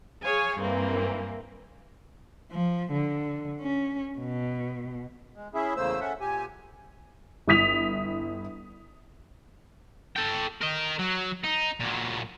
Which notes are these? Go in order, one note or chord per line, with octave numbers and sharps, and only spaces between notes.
G#4 C#5 F5 G#5
G2 E3 A#3 C4
F3
D3
C#4
B2
G#3
C#4 E4 G#4 E5
E2 C#3 A3 A#3 C5 E6
C#4 A4 E5 F#5
A#2 G4 G#5
G1 E4 D#6 B6 F7
A4 G5
A#4 D#5
F#3
D#4
A#2 F#3